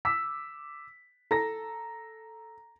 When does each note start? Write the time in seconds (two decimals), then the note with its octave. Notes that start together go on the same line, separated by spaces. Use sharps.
0.05 D6 E6 B6
1.31 A4 A#5 A#6